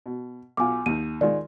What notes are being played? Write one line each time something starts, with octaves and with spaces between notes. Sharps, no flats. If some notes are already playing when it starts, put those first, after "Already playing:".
B2
B1 F4 G#5 D6
D#2 D#4 D#7
D#3 G#3 F4 D5